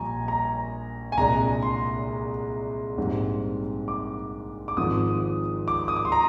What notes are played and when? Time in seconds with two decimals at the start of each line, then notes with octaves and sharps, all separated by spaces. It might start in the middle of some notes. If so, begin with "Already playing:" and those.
Already playing: A#1 A#2 G3 G#5 A#5
0.28 A#5
1.12 G#5
1.17 C2 A#2 G#3 D4 A#5
1.62 C6
2.97 A#1 G#2 G3 C4
3.88 D6
4.68 D6
4.77 G#1 G#2 F3 D#6
5.68 D6
5.88 D#6
5.96 D6
6.05 C6
6.12 A#5